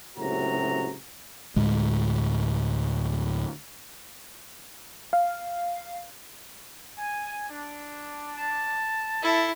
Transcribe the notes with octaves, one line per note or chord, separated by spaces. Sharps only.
F#1 C#2 A2 C3 F#4 A#5
D2 A2 G#3
F5
G#5
D4
A5
E4 A4